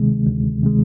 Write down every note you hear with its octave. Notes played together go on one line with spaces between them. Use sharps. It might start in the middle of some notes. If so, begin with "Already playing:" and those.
Already playing: D2 C3 D#3 G#3
D2
C3 D#3 G#3